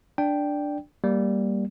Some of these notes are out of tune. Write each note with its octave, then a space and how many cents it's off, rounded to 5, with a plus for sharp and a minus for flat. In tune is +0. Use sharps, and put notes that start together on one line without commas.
D4 +0 D5 +0 G5 +0
G3 +0 A#3 +0